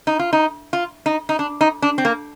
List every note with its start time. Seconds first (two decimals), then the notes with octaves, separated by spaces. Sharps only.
0.07 D#4
0.19 F4
0.33 D#4
0.73 F4
1.06 D#4
1.29 D#4
1.39 D4
1.61 D#4
1.82 D4
1.98 C4
2.05 A#3